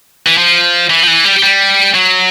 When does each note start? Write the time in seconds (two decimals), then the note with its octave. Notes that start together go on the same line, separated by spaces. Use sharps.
0.27 E3
0.38 F3
0.90 E3
1.03 F3
1.07 E3
1.25 G3
1.43 G3
1.95 F#3